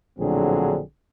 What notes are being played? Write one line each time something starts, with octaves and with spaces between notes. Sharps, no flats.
A#1 A2 D3 F#3 C4 G#4